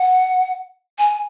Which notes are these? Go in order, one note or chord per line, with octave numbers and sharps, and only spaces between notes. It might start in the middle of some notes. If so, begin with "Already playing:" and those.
Already playing: F#5
G#5